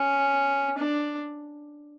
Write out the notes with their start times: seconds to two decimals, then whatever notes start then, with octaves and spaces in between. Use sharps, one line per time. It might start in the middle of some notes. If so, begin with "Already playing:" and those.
Already playing: C#4
0.78 D4